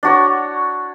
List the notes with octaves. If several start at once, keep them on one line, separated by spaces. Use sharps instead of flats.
D4 F#4 C#5